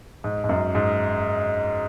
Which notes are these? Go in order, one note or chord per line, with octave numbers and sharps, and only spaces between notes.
G#2
G#2
F#2
G#2